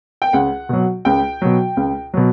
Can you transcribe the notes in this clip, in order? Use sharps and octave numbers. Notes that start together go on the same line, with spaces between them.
G5
C#2 F#5
B2 F#3
C#2 G5
B2 F#3
C#2
B2 F#3